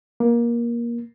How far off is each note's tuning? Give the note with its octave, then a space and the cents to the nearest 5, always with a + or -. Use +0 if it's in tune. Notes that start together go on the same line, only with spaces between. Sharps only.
A#3 +20